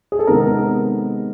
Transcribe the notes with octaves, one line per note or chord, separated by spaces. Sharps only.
G#4
A4
C3 D#3 G#3 B3 A#4